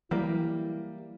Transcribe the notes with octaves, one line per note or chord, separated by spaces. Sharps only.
E3 F#3 G3 A#3 E4